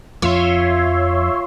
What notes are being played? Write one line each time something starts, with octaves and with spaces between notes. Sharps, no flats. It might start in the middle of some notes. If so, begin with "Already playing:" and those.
F2 F3 F4 C#5 E5 C6